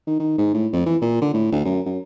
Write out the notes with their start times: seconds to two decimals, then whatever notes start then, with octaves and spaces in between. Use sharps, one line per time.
0.07 D#3
0.20 D#3
0.38 G#2
0.54 A2
0.73 F2
0.86 E3
1.01 A#2
1.22 D3
1.34 A2
1.52 D2
1.65 F#2
1.86 F#2